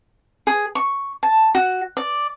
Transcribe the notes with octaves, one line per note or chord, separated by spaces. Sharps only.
G#4
C#6
A5
F#4
D5